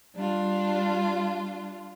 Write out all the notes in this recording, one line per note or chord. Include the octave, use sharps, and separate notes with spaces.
G3 D4 F4